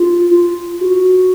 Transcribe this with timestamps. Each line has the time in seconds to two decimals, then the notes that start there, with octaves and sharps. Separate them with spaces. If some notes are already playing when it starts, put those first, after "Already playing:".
Already playing: F4
0.31 F4
0.81 F#4